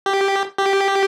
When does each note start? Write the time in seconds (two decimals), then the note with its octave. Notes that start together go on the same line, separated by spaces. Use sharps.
0.06 G4
0.58 G4